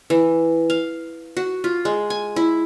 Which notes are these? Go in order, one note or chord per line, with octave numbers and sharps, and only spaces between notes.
E3
F5
F#4
F4
G#3
G#5
E4